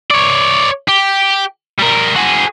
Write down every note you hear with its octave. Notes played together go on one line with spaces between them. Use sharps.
C#5 D5
G4
G3 A#4
F#4 G#4